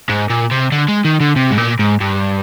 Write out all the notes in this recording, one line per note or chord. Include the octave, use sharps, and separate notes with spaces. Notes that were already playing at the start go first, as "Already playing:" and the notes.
G#2
A#2
C3
D3
G#3
D#3
D3
C3
G#2
A#2
G#2
G2